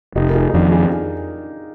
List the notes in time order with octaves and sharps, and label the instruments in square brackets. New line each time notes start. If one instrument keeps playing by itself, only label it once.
[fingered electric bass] F1 [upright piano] D#4 G4
[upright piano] A#4
F4 G#4
D#4
[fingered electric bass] F2 D#3 [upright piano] D4 F4
[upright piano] F4 G#4
G#4